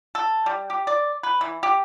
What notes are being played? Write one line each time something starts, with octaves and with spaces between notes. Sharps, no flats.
A4
G3
G4
D5
B4
E3
G4